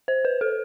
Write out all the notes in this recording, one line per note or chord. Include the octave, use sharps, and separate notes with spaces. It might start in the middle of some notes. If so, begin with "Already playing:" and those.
C5
B4
A4